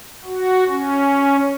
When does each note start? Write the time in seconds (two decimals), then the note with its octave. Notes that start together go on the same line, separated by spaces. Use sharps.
0.25 F#4
0.68 C#4